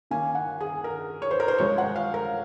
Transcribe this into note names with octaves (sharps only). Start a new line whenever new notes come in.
D#3 A#3 C#4 G#5
F#5
G#4
A#4
C#5
C5
A#4
C5
F3 G#3 C#4 C#5
F#5
F5
A#4